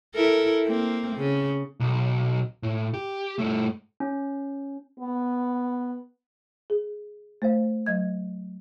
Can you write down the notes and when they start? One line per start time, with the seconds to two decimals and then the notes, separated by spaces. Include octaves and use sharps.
0.15 E4 A4 A#4
0.66 A#3 C4
1.16 C#3
1.80 B1
2.63 A2
2.94 G4
3.39 G2 A3
4.00 C#4
5.00 B3
6.70 G#4
7.42 A3 C5 F5
7.86 F#3 D#5 G#6